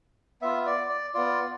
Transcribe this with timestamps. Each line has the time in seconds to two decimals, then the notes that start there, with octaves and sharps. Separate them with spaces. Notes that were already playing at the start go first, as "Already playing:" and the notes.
0.42 B3 F4 E5
0.66 D5
0.90 D5
1.14 B3 F4 D5